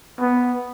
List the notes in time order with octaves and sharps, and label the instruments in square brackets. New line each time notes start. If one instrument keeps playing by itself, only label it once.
[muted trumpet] B3